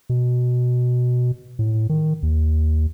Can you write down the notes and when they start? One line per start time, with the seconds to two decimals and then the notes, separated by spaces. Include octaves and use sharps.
0.09 B2
1.59 A2
1.89 D#3
2.23 D#2